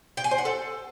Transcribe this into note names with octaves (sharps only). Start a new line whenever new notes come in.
G5
G#5
C5
F#5
A4